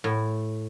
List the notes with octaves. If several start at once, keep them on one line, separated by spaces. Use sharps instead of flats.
A2